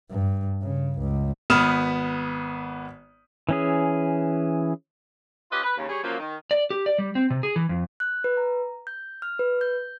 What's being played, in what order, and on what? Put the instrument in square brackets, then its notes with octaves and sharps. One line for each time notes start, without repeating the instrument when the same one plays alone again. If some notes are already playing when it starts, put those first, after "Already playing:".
[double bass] G2
C#3
C#2
[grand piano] G#1 B3 B4 D#6 F6 E7
[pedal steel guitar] E3 C#4 G#4
[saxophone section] C#4 F4 G4 B4 D#5
B4
D#2 C#3
G3 G#4 C#5
F#2 F3 F#3 A#3
D#3
[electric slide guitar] D5
G4
D5
G3
C4
C3
G#4
E3
F2
[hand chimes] F#6
B4
A#5
G6
F6
B4
G6